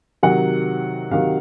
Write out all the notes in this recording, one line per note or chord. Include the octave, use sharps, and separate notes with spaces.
C3 D#3 F#3 F#5
C3 D#3 F#3 F5